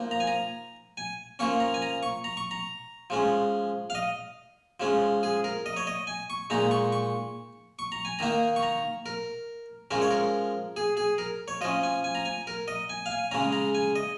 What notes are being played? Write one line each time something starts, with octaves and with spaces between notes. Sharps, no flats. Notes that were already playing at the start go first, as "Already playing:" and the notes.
Already playing: F3 A#3 D#4
A#5
G#5
A#5
G#5
F3 A#3 C#4 C#6
A#5
G#5
A#5
C#6
A#5
C#6
A#5
F3 G#3 C#4
F5
D#5
F3 G#3 C#4
G#4
A#4
D#5
C#5
D#5
G#5
C#6
A#2 G#3 D#4 A#5
C#6
C#6
C#6
A#5
G#5
D#3 A#3 D#4 A#5
C#6
A#5
A#4
F3 G#3 C#4 A#4
C#5
A#4
G#4
G#4
A#4
C#5
F3 C#4 D#5
G#5
G#5
A#5
G#5
A#4
D#5
G#5
F5
G#5
C#3 G#3 C#4 A#5
A#5
G#5
D#5